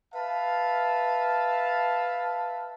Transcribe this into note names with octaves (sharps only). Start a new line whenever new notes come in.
B4 E5 F5 A5